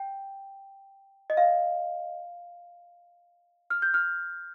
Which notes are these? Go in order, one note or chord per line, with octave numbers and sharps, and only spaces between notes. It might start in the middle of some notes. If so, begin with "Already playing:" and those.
Already playing: G5
D#5
F5
F6
G6
F6